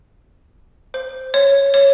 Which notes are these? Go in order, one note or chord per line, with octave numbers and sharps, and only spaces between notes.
C5
C#5
C#5